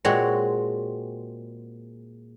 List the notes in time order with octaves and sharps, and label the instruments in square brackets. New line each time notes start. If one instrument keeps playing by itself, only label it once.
[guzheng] A#2 G#3 C4 F#4 C#5